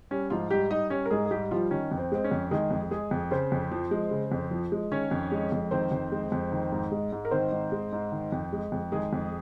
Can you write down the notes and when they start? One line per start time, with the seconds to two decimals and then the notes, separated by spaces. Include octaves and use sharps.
0.11 G3 C#4
0.30 G#2 F3 F4
0.50 G#2 G3 G4
0.70 G3 D#4 D#5
0.90 G3 C#4 C#5
1.06 A#4
1.10 G#2 G#3 G#4
1.25 G#4
1.31 G#2 G3 G4
1.51 F3 G3 F4
1.71 D#3 C#4
1.91 F2
1.98 C4
2.12 G#3 C4
2.24 C#4
2.31 F2
2.51 D#3 G#3 G#4
2.71 F2
2.91 G#3 G#4
3.11 F2
3.31 C#3 C4 C5
3.52 F2
3.71 F3
3.91 G#3
4.11 C#3
4.32 F2
4.51 F3
4.72 G#3
4.92 D#3 C#4 C#5
5.11 F2
5.32 G#3
5.52 F2
5.71 D#3 C4 C5
5.92 F2
6.12 G#3
6.32 F2
6.52 D#3
6.72 G#2
6.91 G#3
7.12 G#2
7.25 A#4
7.31 D#3 C4 C5
7.51 G#2
7.72 G#3
7.92 G#2
8.12 D#3
8.32 F2
8.52 G#3
8.72 F2
8.92 D#3 G#3 G#4
9.13 F2